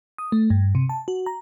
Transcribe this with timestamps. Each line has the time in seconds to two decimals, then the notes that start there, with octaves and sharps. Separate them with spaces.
0.18 D#6
0.32 A3
0.50 G2
0.75 C3
0.89 A5
1.08 F#4
1.26 A#5